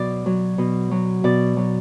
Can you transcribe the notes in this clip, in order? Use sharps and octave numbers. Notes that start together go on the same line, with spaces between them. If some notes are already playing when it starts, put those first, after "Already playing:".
Already playing: B2 F#3 D5
F#3
B2
F#3
B2 D5
F#3